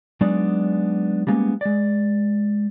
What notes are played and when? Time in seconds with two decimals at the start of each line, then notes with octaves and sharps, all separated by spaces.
0.21 F#3 G#3 B3 D4 D#4 D5
1.27 G3 G#3 A#3 B3 C#4
1.61 G#3 D5